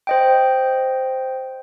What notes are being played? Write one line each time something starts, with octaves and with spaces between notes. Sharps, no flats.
C5 D#5 G5